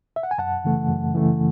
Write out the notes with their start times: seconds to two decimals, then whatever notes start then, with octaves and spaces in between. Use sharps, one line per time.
0.16 E5
0.23 F#5
0.31 G#5
0.38 F#2 F#5 A5
0.64 C#3 E3 A3
0.89 F#2
1.14 C#3 E3 A3